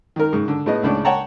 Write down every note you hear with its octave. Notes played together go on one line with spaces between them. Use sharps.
D#3 A#4
G#2 C#3
D3
A2 G#3 B3 D#5
C#2 A2 C#3 D4
C#5 F#5 G5 A5 A#5